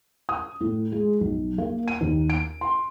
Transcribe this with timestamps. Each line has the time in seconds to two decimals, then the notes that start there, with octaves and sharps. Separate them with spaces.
0.29 D#6
0.61 A2
0.92 G#3
1.21 B1
1.58 A#3
1.88 D#7
2.01 D#2
2.30 D7
2.61 C6